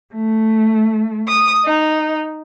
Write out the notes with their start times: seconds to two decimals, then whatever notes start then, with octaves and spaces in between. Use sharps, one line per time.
0.14 A3
1.28 D#6
1.65 D#4